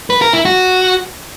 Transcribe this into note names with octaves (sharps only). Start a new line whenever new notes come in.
B4
A#4
E4
F#4